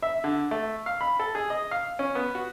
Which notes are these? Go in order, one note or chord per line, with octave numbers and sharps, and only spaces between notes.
E5
D3
A3
F5
B5
A4
G#4
D#5
F5
C#4
B3
F#4